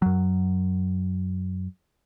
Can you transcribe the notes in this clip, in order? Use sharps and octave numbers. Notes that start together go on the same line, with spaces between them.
F#2 F#3